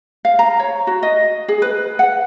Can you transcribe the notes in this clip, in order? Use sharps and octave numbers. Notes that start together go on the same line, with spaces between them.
F5
A#5
C#5
F#4
D#5
G#4
B4
F#5